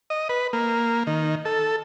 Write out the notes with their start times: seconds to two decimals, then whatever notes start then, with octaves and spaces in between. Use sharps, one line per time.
0.10 D#5
0.29 B4
0.53 A#3
1.07 D#3
1.45 A4